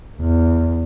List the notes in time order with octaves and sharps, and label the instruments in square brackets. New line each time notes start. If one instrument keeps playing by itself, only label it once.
[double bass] E2